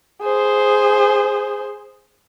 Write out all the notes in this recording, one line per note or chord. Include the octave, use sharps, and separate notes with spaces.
G#4 C5